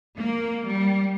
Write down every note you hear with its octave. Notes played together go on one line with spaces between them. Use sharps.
A#3
G3